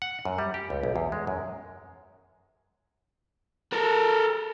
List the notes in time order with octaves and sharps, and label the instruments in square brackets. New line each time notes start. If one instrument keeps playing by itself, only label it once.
[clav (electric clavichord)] F#5
F#2
G3
G4
C#2
B1
E2
G#3
F#2
[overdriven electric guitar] A4 A#4